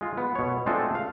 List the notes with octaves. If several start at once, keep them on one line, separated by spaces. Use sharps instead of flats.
G#3 F4
B3
B2 C#5
G#3 A3 C4 D4 F4 A4
F5